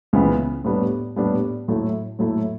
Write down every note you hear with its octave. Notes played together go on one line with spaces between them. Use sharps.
C#2 C#3 E3 B3
A2 G3 B3 D4
A2 G3 B3 D4
A2 F#3 A3 E4
A2 F#3 A3 E4